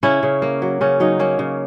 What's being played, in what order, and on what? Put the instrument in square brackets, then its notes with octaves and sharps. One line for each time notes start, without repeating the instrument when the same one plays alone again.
[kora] C#3 C#4 E4
C#3
A#3
F#3
C#3 C#4
F#3 D#4
A#3 C#4
C#3